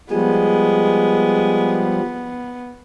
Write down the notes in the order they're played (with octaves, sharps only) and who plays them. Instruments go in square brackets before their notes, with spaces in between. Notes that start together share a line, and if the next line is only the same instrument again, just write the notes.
[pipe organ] F3 G3 [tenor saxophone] G#3 [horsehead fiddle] B3